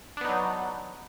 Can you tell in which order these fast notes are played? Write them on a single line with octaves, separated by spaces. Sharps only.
D4 B3 D#4 F#3